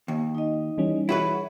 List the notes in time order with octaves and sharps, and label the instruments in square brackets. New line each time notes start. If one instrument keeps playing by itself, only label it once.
[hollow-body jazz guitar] D#2
[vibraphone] D#4 D#5
[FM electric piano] E3 G3 C#4
[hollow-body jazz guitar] E4 F#4 B4 [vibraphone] G#4 C#5 E5